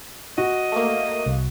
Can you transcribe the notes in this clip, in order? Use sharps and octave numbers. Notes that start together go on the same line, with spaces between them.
F#4 D#5
A3 A#3
C2